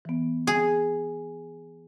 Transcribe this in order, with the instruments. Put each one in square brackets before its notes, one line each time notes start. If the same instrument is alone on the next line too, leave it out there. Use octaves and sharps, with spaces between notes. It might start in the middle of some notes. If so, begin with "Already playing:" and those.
[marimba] E3 B3
[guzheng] G#4